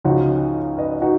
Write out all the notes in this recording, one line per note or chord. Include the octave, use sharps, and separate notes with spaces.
C#2 C#3 F3 D#4 F#4
B4 D#5
D#4 F#4